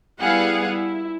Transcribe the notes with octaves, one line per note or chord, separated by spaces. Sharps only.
G3 B3 E4 G#4 F5 F#5
E4